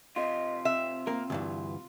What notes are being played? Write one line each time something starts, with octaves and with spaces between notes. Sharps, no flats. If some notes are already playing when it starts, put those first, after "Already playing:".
C3 F4 D#5
C4 E5
A#3 A#4
D2 G2 E3